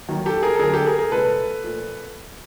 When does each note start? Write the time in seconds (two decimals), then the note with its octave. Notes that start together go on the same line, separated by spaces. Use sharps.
0.09 D#2 D#3 F#3
0.26 G4 A4
0.43 G#4 A#4
0.55 A4
0.59 D2 D3 F#3 G#4 A#4
0.73 G4 A4
0.86 G#4 A#4
0.99 G#4 A#4
1.11 C2 A#2 F3 G#3 A4 B4
1.64 A#2 F3 A3